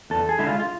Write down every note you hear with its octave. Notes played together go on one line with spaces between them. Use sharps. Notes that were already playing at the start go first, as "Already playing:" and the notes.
E2 A4
G#4
D3 G#3 E4
F4
F4